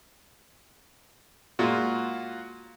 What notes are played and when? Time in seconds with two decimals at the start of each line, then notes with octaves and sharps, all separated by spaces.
1.59 A#2 G#3 F4 F#4